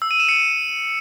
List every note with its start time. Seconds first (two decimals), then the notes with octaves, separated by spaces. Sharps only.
0.02 E6
0.11 D#7
0.20 E7
0.29 C#7